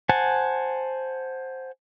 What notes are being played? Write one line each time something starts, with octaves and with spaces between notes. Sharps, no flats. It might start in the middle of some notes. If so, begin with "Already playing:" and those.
C5 F#5 G#5 A5